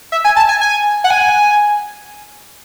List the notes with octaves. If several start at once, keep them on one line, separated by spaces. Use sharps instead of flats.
E5
G#5
A5
G#5
G#5
F#5
G#5